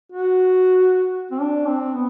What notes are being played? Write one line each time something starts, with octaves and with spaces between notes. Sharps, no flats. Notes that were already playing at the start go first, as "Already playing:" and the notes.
F#4
C4
D4
C4
B3